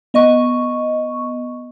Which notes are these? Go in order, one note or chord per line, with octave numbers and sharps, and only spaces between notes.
B3 D#5 C#6